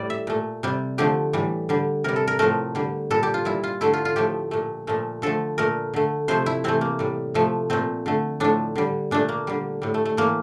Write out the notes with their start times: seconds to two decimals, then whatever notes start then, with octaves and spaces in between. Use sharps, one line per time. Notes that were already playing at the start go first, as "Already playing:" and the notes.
Already playing: A2 G3 D5
0.10 E5
0.27 A#2 A3
0.63 C3 G3
0.98 D3 F3 A3 G4
1.33 A2 E3 G3
1.69 D3 G3
2.04 C3 G3 A#4
2.16 A4
2.27 A#4
2.39 A2 F3 A3 A#4
2.75 D3 G3
3.10 A#2 G3 A4
3.23 G4
3.34 F4
3.45 A#2 G3 E4
3.64 F4
3.81 D3 A3 E4
3.93 F4
4.05 F4
4.16 A2 F3 A3 G4
4.51 A#2 A3
4.87 A#2 F3 A3
5.22 D3 F3 A3 A4
5.58 A#2 A3 A#4
5.94 D3 A3
6.28 C3 F3 A3 C5
6.46 E4
6.64 C3 E3 A3 C4
6.81 A#3
6.99 A2 G3
7.34 C3 F3 A3
7.70 A#2 A3 C4
8.06 D3 A3
8.40 A2 F3 A3 D4
8.76 D3 G3
9.11 A#2 A3 D4
9.29 A#3
9.47 D3 G3
9.82 A2 G3
9.94 A3
10.05 A3
10.17 A2 E3 A3 A#3